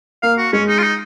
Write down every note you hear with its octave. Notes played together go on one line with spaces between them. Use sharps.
A#3 F5
F#4
G#3 C#4
D#4
F4
D#4